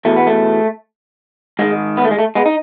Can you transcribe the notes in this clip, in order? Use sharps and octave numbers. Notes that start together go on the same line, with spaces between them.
E2 B2 A3
B3
A3
G#2 D#3 G#3
B3
A3
G#3
A3
G#3 B3
D#4